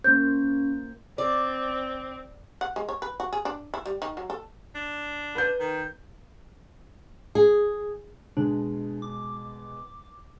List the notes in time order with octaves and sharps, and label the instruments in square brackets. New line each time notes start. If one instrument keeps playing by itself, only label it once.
[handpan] A#3 C5 [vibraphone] C#4 [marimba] G6
[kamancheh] C4 [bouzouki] D5
[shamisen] F#5
G#3
C#5
B4
F#4
G#4
D4
E4
G3
D#3
F#3
A4
[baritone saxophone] D4
[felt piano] B4 G6
[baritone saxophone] D#3
[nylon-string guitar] G#4
[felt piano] B2 G#3 [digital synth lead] D4
[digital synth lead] D6